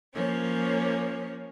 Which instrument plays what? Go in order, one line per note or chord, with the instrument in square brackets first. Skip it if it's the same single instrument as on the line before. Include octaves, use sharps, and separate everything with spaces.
[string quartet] F3 A#3 C#4 C#5